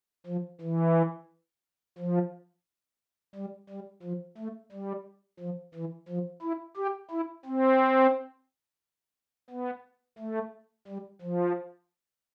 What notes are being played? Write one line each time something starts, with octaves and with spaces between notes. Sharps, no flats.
F3
E3
F3
G3
G3
F3
A3
G3
F3
E3
F3
E4
G4
E4
C4
B3
A3
G3
F3